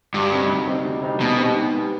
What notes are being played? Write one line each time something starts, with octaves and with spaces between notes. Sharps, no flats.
D2 G2
C3 G3 C4 D#4
D2
C3 G3 C4 D#4
D2
C3 G3 C4 D#4
D2 B2
C3 G3 C4 D#4
G#2
G3 B3